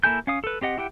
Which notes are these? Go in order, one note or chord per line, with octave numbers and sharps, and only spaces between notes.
A#3 E4 A4 G#5 G6
C#4 F5 D#6
A4 B4
C4 G4 D#5 F#5
E4 G4 F#5 G5